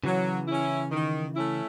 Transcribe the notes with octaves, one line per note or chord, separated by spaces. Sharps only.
C#3 E3 F#3
C#4 E4
D#3
A3 C#4 E4